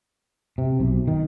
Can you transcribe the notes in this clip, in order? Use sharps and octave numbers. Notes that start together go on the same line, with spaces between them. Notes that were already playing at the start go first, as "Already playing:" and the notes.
C3
B1
D#3